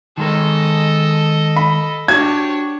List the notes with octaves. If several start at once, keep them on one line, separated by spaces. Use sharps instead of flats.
D#3 G#3 A4 A#4 D#5
B5
D4 F#4 G4 C#5 G#6